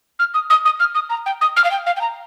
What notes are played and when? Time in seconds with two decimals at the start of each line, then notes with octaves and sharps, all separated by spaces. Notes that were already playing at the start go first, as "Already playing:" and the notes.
0.19 F6
0.34 D#6
0.50 D#6
0.65 D#6
0.80 F6
0.95 D#6
1.10 A#5
1.26 G5
1.41 D#6
1.56 F6
1.64 F5
1.71 G5
1.86 F5
1.97 G5
2.01 A#5